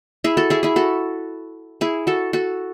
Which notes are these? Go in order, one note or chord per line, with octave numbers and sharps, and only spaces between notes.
E4 G#4
F#4 A4
E4 G#4
E4 G#4
F#4 A4
E4 G#4
F#4 A4
F#4 A4